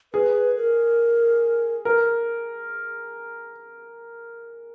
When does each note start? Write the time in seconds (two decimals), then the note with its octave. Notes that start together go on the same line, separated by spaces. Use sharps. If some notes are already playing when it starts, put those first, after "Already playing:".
0.13 G#4 B4
0.57 A#4
1.85 A#4